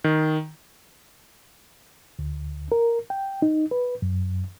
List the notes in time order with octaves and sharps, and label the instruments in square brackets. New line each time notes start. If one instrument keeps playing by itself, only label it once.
[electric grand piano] D#3
[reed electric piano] D2
A#4
G5
D#4
B4
F#2